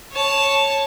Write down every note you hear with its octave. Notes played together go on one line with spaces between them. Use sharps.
C#5 A5